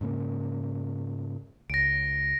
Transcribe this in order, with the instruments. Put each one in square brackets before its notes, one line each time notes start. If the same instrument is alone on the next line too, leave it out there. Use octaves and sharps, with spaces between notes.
[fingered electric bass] G#2 C#3 A#3
[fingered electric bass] C#2 [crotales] A#6 D7